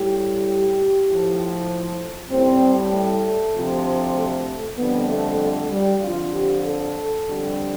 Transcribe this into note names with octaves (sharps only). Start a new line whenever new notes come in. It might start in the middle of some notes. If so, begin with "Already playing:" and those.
Already playing: A2 G3 G4
A2 F3
A2 G3 C4
A3
D2 C3 F3
A3
F2 D3 G3 B3
A3
A3
G3
F2 D3 F3 F4
G4
A4
F2 D3 G3